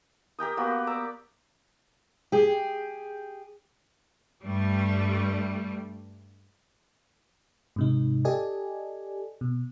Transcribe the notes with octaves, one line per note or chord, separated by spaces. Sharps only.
G4 A#4 G5 D#6
A#3 B3 F#4 G4
D5 A#5 E6
G4 G#4
G2 G3 A3
G#2 C3 D#4
G4 A4 D5 D#5 G#5
B2